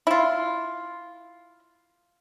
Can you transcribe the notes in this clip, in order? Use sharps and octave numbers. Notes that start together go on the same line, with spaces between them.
E4 F4